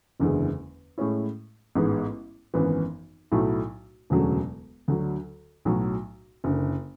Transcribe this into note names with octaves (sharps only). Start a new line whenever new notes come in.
F#1 E2 D3 G#3
A2 G#3 C#4 E4
A1 G#2 G#3 B3
G#1 F#2 E3 B3
B1 A2 F#3 A3 E4
E1 D2 C#3 F#3 A3
D2 D3 F#3
B1 A2 F#3
F#1 F#2 D3